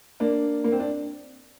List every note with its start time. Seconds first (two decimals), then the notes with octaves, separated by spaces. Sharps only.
0.20 A#3 D4
0.64 A#3
0.72 C4
0.80 D4